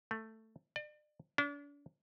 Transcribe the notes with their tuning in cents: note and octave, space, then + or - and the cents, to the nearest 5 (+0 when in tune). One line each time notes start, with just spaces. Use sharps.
A3 +10
D5 +40
D4 -40